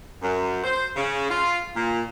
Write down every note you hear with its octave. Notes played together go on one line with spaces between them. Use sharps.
F#2
C5
C#3
F4
A#2